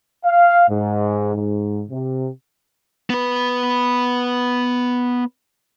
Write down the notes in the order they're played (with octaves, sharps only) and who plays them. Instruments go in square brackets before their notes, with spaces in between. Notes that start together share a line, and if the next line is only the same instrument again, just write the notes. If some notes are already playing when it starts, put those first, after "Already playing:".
[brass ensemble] F5
G#2
G#2
C3
[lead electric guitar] B3 B4